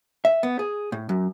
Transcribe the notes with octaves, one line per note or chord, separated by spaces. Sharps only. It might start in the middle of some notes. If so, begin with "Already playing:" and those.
E5
B3
G#4
A2
F#2